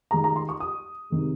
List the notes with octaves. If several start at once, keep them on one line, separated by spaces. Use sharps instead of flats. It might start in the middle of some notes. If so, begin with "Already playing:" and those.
D#3 G#3 A#5
A#5
C6
C#6
D#6
C3 D#3 G#3